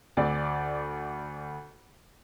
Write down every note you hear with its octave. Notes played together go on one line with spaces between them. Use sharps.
D2 D5